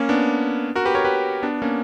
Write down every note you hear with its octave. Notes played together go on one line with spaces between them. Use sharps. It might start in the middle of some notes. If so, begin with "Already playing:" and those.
Already playing: A#3 C#4
B3 D4
F#4 A#4
G4 B4
A#4 C#5
G4 B4
B3 D4
A#3 C#4